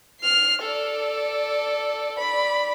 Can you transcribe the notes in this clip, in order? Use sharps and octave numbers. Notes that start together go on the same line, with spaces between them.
F6 C7
A4 D5
D5 B5